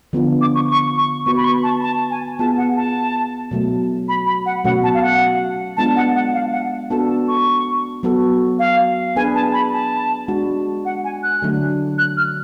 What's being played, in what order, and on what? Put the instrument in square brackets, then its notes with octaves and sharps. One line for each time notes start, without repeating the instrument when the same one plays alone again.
[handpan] D3 F3 B3 D4 F4
[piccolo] D6
C#6
C#6
C#6
[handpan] B3 F#4 B4 [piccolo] C#6
[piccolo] B5
C#6
A5
A5
G#5
[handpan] B3 F4 G#4 [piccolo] A5
[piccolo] F#5
A5
[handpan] B2 F#3 A3
[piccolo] B5
B5
F#5
[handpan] B2 F#3 A3 C#4 F#4 [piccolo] F#5
[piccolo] A5
F5
F#5
[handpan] G#3 B3 D4 F4 [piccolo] A5
[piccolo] F#5
F#5
F5
F#5
[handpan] B3 D4 F#4 A4 [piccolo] A5
[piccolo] A5
C#6
[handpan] F#3 B3 F#4 A4
[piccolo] F5
[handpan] B3 D4 G#4 B4 [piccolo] G#5
[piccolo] A5
B5
A5
[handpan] G#3 D4 F#4
[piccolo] F#5
G#5
F#6
[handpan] D3 F#3 A3 D4
[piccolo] F#6
F6